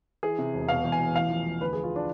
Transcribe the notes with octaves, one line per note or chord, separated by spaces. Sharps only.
E3 G#4
C3
E1
B2 F5
E2
G#5
E2
A1 F5
F3
A1
D2 B4
G#4
F3
F4
D4